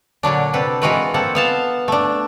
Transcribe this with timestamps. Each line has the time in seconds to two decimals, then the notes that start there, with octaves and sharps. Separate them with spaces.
0.23 A#2 D3 F#3 D4
0.54 C3 A4 B4
0.82 E3 G#3 F4 F#4 A#4 B4
1.14 A#3 C4 A4 F#5
1.35 B3 F5 A5
1.88 A3 D4